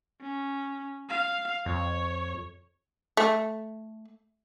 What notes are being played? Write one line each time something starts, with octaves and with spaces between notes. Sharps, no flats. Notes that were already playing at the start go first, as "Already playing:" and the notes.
C#4
F5
F2 C#5
A3